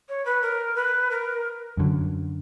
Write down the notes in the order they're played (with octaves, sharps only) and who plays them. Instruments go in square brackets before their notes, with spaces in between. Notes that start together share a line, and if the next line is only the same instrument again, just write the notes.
[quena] C#5
B4
A#4
B4
A#4
[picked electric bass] F#2 D3 F#3